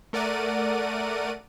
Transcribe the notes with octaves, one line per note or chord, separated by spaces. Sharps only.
A3 A#4 D5 F#5 D#7